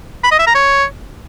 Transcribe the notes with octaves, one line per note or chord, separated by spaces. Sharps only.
B5
D#5
E5
A#5
C#5